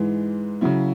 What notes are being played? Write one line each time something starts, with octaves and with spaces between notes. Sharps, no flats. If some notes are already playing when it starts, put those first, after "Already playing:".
Already playing: G#2 E3 G#3
C#3 F#3 E4